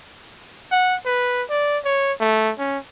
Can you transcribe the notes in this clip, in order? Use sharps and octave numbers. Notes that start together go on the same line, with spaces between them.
F#5
B4
D5
C#5
A3
C#4